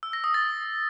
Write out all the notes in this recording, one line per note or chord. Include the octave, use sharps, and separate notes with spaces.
E6
A#6
D#6
A6